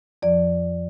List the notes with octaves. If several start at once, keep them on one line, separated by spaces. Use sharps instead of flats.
F2 F3 D5